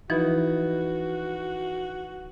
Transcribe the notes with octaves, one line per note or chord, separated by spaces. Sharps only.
E3 F3 D#4 E4 F#4 B4